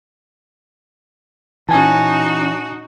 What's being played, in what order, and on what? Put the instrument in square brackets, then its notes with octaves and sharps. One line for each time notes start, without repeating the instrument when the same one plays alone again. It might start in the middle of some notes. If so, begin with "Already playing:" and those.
[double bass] A#2 C#4 [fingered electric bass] E3 [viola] D#4 F#4 [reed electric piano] G#5 A5